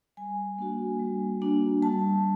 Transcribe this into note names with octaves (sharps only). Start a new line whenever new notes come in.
G3 G#5
A#3 D4 F#4
G3
A#3 D4 F#4
G3 A5